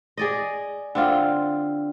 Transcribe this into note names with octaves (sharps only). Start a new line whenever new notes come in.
G#4 D5 D#5
D3 C4 F4